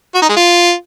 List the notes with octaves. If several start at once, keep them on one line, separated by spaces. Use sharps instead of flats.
F#4
D#4
G#3
F4